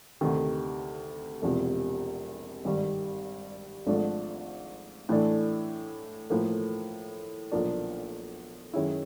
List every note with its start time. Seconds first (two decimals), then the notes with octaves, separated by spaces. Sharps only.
0.21 D2 C3 D#3
1.42 E1 E2 C3 F3
2.65 G#1 G2 D#3 G3
3.87 G#1 G#2 F3 A3 D4
5.09 A2 E3 A3 D4
6.30 A2 F3 A#3
7.52 B1 A#2 F3 A#3 D4
8.74 F#2 D#3 G#3 C#4 E4